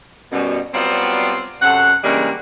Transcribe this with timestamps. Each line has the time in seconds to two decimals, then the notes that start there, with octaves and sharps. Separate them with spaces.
0.32 F#2 B2 G3
0.74 F#3 G3 B3 C4 F4 D5
1.62 F#2 C3 A4 F#5
2.04 C#3 E3 G3 G#3 A#3 D4